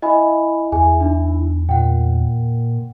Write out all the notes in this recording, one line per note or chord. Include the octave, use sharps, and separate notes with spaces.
E4 D#5 G#5 B5
E2 G#4 G#5
D4 D#4
A#2 F#5 G5